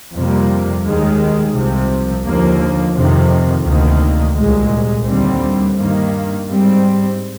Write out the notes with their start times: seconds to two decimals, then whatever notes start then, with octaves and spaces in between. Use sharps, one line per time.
0.15 F2 C3 G3 A#3
0.85 D#2 D#3 G#3
1.55 C2 C3 F3
2.25 D#2 D3 F3 A#3
2.96 F2 C3 D#3
3.65 D2 C3 D#3 A#3
4.36 C2 A#2 G#3
5.06 D#2 D3 G3 C4
5.76 G2 D#3 A#3
6.46 G#2 G3 C4